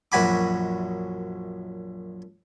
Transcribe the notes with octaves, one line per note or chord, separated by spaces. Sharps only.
A#1 F#2 F#4 G#5 B5 D6